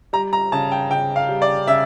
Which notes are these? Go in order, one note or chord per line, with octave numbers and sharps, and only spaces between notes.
G3 A#5
A#5
C#3 A5
G5
C#3 G5
F5
G3
D5
C#3 E5